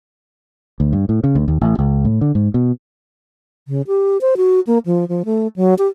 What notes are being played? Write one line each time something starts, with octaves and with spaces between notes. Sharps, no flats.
D2
G2
A2
C#3
D2
D#2
A1
C#2
A2
D3
G#2
B2
C#3
G4
C5
F#4
A#3
F3
F3
A3
F#3
G4